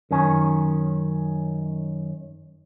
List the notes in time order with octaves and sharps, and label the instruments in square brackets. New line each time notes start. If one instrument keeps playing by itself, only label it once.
[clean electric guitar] F#2 D#3 C#4